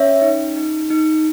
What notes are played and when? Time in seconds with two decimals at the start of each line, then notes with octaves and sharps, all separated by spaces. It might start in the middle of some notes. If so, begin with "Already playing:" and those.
Already playing: C#4 C#5 E5
0.21 D#4
0.56 D#4
0.90 D#4